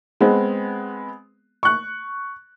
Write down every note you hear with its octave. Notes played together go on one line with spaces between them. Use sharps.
G#3 B3 C4
C#6 F#6